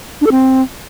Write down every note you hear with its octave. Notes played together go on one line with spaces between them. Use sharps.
D4
A4
C4